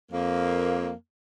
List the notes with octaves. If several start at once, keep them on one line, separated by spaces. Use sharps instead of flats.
F2 A#3